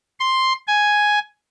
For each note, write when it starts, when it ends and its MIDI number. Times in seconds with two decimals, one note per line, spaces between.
0.20 0.53 84
0.67 1.19 80